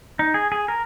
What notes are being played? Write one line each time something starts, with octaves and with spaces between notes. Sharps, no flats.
D#4
G#4
G#4
A#4